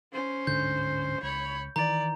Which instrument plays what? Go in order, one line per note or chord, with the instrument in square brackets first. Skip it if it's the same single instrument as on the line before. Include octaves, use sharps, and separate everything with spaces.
[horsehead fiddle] C#4 C5
[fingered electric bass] D1 G#2 D3 [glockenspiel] G6
[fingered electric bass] C#2 [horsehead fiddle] C#5 B5
[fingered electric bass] D#3 E3 [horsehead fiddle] D5 [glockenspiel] A#5